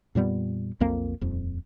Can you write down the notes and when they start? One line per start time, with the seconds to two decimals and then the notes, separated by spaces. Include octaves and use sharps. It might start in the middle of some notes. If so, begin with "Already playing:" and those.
0.15 F2 A#2 G3 B3
0.80 B1 F2 A#3 C4
1.21 D#1 F2